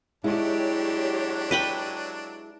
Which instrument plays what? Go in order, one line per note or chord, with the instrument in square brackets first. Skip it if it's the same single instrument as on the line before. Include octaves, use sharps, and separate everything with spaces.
[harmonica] F#3 D4 [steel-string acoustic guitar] G#3 E4 [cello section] G4 C#5
[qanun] B4 G5 B5